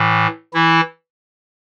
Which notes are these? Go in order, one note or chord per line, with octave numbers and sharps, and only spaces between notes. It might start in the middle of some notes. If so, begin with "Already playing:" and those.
Already playing: A2 E3
E3 E4